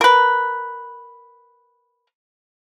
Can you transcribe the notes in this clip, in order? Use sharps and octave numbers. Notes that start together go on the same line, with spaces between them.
A#4 B4